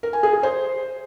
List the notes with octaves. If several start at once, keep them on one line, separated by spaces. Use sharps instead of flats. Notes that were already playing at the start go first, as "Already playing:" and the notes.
A#4
G#5
G#4
G#4
C5